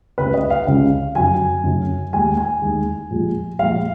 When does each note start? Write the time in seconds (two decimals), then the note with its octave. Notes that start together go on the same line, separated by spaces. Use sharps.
0.18 C#2 C#3 G#3 B4
0.34 D#5
0.50 F5
0.66 C#2 C#3 G#3 F5
1.15 F#2 C#3 F#3 G#5
1.64 F#2 C#3 F#3
2.13 D#2 D#3 G#3 G#5
2.37 G#5
2.62 D#2 D#3 G#3
3.11 A#2 F3 G#3
3.59 A#2 F3 G#3 F5